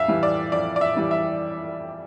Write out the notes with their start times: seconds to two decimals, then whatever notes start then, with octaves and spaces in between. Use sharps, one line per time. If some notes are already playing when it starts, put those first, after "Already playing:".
Already playing: F2 E5 F5
0.08 E3 G3
0.23 D5
0.52 F2 D5
0.76 D5
0.81 E5
0.96 E3 G3
1.11 E5